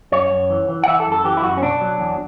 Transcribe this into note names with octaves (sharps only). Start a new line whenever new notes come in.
F#2 C#5
F#2
E3
E3
F#5
E3 E5
A4
F#2
A4
E3 G4
E4
F#2 F#4
C#4
B2 D4
F#3
E2